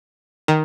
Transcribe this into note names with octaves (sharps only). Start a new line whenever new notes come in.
D#3